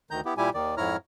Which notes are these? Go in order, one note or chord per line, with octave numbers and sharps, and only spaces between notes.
D2 D#3 A#5 G6
B3 E4 G4
A#2 G3 E4 G4 G#5
D#2 D#3 D5
F2 G#2 E4 C#5 A#5 F6